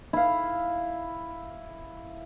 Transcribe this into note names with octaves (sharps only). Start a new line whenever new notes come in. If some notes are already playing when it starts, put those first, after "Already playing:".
E4 F5